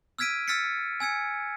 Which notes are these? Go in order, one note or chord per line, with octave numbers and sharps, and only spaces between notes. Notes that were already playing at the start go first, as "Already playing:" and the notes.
E6 F6 G#6 B6 D7 D#7
E6 F6 A6 B6 C#7
G#5 E6 G#6 C#7